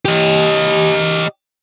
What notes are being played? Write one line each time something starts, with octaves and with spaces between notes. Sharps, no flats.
G4 D#5